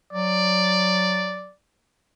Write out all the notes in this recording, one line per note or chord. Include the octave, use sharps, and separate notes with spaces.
F#3 D5